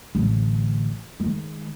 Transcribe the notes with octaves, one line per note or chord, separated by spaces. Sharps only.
A1 D3
D#3 G#3